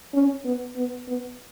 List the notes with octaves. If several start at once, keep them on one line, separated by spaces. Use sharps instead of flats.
C#4
B3
B3
B3